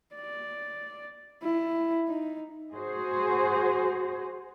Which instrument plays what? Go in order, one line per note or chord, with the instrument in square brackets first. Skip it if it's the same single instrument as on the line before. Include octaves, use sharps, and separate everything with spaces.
[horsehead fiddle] D5
E4
D#4
[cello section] F#4 G#4 C5